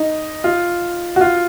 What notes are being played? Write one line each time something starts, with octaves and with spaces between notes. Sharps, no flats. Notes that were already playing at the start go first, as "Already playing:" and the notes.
Already playing: D#4
F4
F#4
F4